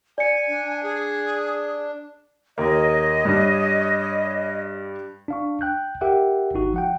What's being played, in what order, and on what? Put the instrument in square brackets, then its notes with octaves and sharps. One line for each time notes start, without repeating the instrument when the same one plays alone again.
[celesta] D5 C#7 [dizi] G#5
[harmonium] D4
[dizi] G#4
[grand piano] D#2 A#3 [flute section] C#5 D#5
[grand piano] G2 G3 D4
[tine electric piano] D4 F5 C#6
G5 F#6 G6
G4 A#4 E5 F#5 G5
G#1 D#4 F#4
F3 F#5 G5